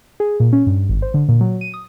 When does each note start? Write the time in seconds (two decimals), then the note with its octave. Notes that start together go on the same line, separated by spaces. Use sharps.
0.20 G#4
0.40 A#2
0.53 C#4
0.67 G2
0.89 G#1
1.02 C5
1.14 D3
1.29 A#2
1.41 F#3
1.61 D#7
1.74 D#6